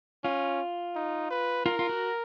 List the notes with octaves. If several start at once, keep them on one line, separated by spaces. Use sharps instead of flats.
C#4 F4
D#4
B4
F4 A#4
F4
F#4